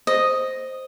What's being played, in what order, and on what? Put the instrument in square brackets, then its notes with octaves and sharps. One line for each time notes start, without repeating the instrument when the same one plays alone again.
[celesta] C5 [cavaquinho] D#5